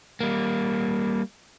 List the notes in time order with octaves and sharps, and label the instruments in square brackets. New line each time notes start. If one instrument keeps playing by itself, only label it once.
[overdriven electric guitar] G3 A#3